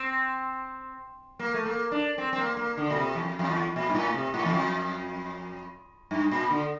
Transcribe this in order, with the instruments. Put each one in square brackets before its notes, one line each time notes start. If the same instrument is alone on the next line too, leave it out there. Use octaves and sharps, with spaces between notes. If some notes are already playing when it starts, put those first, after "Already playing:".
Already playing: [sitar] C4
A#3
A3
A#3
D4
C4
C4
A#3
A#3
D3
A#2
C3
E2
F2
F2
E2
A#2
G2
A2
C3
A2
E2
F2
G2
A#2
D3